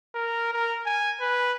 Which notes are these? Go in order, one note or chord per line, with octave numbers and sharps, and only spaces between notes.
A#4
A#4
G#5
B4